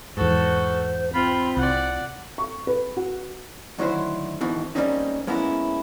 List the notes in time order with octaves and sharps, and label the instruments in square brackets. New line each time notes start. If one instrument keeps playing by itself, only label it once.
[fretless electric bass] E2 G#2 [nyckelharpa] F#4 A4 [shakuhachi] C5
[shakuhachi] C4 [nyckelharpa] F4 B5
[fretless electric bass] C2 [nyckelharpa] D5 F#5
[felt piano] C#6
B4
F#4
[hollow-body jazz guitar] D2 D#3 F#3 E4 C5
G#2 B2 D#3 E3 C4
G3 G#3 A#3 C4 C#4 D#4
G#3 A#3 B3 C#4 E4